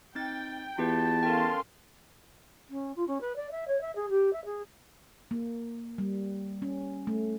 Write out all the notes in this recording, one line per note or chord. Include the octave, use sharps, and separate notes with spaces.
C4 D#4 G5 A6
E2 F4 G4 B4 A5
C#4 A4 A#4 F5 G5 C6
C#4
F4
C#4
B4
D5
E5
C#5
E5
G#4
G4
E5
G#4
A#3
G3
C#4
A3